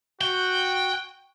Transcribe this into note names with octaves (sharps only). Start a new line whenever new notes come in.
F#4 G5